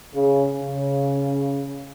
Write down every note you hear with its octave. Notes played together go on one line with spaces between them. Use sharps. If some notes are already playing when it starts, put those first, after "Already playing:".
C#3
C#3